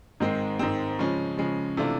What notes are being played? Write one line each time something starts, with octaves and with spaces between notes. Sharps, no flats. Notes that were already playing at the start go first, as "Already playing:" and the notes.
G#2 D#3 G#3 C4
G#2 D#3 G#3 C4
C#3 F3 G#3 C#4
C#3 F3 G#3 C#4
C3 E3 A3 D4 F4